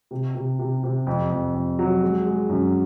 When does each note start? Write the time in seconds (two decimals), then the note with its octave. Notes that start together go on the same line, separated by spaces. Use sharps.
0.11 C3
0.35 C3
0.59 C3
0.83 C3
1.07 F2
1.30 F2
1.54 F2
1.79 F#3
2.02 G#3
2.25 G#3
2.49 F#2